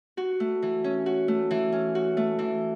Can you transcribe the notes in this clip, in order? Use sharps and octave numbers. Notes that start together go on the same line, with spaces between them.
F#4
A3
E3
C#4
F#4
A3
E3
C#4
F#4
A3
E3